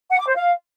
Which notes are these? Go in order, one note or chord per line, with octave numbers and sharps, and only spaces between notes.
F#5
D6
C5
F5